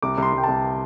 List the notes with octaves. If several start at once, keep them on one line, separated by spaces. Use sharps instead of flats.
C2 D6
C2 C6
C2 G5
C2 A5